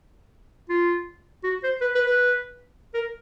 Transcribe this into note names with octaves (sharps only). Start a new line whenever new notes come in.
F4
F#4
C5
B4
B4
B4
A#4